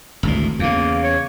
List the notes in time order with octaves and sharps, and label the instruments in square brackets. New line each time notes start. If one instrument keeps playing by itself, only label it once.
[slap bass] G#1 D2 A2
[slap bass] E2 C#3 [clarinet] A#3
[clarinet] C#5